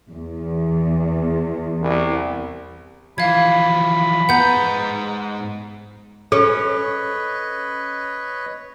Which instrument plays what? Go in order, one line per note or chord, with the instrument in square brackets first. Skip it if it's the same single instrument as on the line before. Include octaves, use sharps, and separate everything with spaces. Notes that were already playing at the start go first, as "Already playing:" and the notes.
[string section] E2
[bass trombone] C2
[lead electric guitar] E3 F3 [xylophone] F5 G#6 [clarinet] B5
[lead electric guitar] G#2 A#5 [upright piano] B3 [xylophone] F#5 G6
[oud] C#4 [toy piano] A4 [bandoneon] B4 C#5 D#5